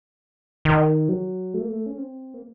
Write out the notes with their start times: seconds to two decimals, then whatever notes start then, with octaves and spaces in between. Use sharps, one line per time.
0.65 D#3
1.09 F#3
1.54 A3
1.61 A#3
1.68 A3
1.86 C#4
1.98 C4
2.34 A#3